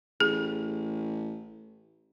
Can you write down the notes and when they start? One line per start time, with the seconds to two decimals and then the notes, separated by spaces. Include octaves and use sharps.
0.20 A1 G#4